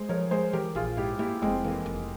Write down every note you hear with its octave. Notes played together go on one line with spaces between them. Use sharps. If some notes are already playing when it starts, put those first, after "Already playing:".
Already playing: G#3 G#4 C5
F3 A#4 C#5
G#3 G#4 C5
E3 G4 A#4
A#1 F4 G#4
G#2 E4 G4
A#3 E4 G4
F1 G#3 C4
E3 A#3
F1